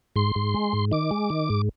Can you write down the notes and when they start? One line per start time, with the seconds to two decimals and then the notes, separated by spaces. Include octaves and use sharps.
0.16 G#2 C6
0.36 G#2
0.54 G#3
0.73 G#2
0.92 D#3 D6
1.11 G#3
1.30 D#3
1.50 G#2